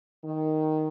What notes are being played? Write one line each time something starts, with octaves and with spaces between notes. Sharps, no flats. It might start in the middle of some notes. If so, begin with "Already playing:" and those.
D#3